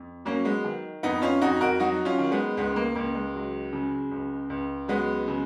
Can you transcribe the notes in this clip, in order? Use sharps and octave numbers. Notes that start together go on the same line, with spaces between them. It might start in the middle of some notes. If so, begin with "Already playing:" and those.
Already playing: F2
F#3 A#3 C#4
G#3 B3
D#3
F2 B3 D#4
C#4 F4
F2 D#4 F#4
F#4 A#4
F#3 D#4 F#4
C#4 F4
D#3
G#3 B3
C#2 G#3 B3
A#3
C#2 A#3
G#3
F#3
C#3
C#2
C#2
F#3 G#3 B3
C#3